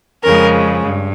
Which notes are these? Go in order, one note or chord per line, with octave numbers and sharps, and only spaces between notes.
F2 C#3 G#3 A#4
G2